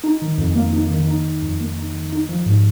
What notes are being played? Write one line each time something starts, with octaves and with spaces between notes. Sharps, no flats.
D#4
D#3
F2
A#3
D#4
D#3
D#4
D#3
F2
A#3
D#4
D#3
D#4
F3
G#2